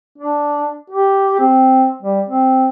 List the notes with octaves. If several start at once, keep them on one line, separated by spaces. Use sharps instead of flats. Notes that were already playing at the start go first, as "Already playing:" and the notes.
D4
G4
C4
G3
C4